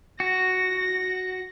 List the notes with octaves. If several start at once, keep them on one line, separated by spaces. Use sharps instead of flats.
F#4 A#6